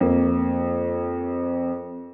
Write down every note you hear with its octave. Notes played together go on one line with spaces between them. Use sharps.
F2 A#3